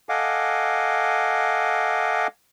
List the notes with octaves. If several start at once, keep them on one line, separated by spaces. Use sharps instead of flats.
A4 D#5 F5 F#5 G#5 D6